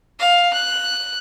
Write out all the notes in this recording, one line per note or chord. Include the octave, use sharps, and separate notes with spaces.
F5
F#6